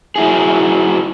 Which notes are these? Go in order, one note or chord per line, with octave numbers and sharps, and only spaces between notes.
F#3 E4 G#4